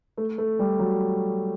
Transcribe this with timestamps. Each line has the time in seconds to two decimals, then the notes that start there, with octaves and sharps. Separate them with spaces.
0.18 A3
0.38 A3
0.59 G3
0.79 F#3